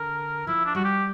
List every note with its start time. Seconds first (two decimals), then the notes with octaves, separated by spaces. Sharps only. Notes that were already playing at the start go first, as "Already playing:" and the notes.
Already playing: D3 A#4
0.47 F3 E4
0.66 D4
0.75 G3 F#4
0.84 G4